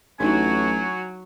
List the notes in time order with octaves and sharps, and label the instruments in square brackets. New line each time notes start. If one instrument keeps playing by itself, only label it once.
[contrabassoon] A1 [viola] F#3 F#4 [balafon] D4 D#4 [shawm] G#5